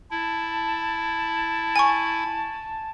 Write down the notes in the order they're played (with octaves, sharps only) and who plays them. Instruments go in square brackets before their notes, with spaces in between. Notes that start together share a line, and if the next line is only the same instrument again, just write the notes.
[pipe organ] E4 [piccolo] A5
[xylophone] G#5 C#6